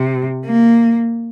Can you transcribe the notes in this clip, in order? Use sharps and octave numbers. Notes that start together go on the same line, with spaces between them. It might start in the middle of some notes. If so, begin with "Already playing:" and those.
Already playing: C3
A#3